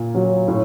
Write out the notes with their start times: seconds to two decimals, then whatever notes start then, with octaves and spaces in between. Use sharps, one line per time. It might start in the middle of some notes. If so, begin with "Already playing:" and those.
Already playing: A#2
0.14 F#3
0.48 A2